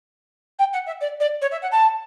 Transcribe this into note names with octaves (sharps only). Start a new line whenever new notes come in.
G5
F#5
E5
D5
D5
C#5
E5
F#5
A5